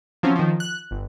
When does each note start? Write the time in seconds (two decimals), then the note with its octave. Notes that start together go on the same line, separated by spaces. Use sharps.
0.23 F3 F#3 C4 C#4
0.35 D#3 F3
0.60 F#6
0.91 G1